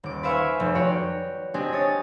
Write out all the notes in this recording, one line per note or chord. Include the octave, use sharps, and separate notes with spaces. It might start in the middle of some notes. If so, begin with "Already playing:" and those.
D#1 D6
B4 C5 E5 F5 G#5 C#6
F1
F#4 C#5 D5 G5
C4 D4 G4 D#5 G#5
C#5 D#6 A6